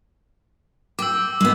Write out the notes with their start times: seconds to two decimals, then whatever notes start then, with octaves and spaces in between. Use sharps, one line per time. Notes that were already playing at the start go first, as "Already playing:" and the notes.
0.99 G5 D6 E6
1.41 G#3 B3